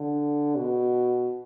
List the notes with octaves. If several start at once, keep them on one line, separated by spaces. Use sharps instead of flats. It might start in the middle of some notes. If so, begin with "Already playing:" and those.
Already playing: D3
B2